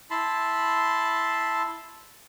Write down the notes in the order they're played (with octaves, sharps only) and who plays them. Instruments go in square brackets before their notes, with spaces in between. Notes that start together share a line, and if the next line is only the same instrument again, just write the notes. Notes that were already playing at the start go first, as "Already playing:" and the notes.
[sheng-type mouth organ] E4 A5 B5 C6